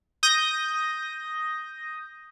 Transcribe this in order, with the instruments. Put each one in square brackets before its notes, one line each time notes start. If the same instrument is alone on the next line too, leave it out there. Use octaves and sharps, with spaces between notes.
[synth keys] D#6 G6 A#6